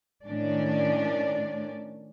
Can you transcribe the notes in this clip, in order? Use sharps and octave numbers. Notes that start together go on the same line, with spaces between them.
A2 D#3 C#4 D4 D5